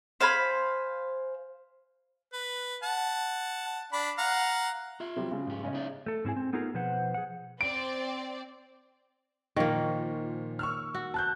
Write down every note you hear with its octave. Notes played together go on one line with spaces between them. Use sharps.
C5 F5 G#5 B5
B4
F#5 A5
D4 B5
F5 F#5 A#5
F4 E5
C3 F#3 G3
C#3 G#3
G#2 G4
C#3 C#4 D#5
D#4 E4 D5
A3 A4
G#2 D3 C4 E4 G#4 G#5
C4
A3 B3 D#4 F4 G#4 A#4
B2 F3 B4 C5 F#5
G#4 F#5
C4 D5 D7
A#2 D#3 F3 A#3 C#6
C#6 E6 F6
F#4
A5 F#6 G6